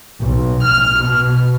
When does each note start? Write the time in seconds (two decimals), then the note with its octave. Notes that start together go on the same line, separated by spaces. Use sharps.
0.20 B1
0.64 F6
0.99 B2